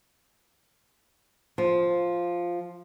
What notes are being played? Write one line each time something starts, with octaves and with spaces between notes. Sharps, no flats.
F3